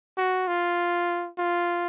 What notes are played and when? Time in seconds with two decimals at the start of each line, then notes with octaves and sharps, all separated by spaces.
0.17 F#4
0.48 F4
1.39 F4